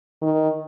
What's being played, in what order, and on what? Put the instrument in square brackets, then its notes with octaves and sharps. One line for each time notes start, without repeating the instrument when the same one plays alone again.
[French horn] D#3